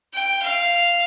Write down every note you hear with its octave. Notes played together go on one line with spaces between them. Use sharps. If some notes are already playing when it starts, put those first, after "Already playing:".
G5
F5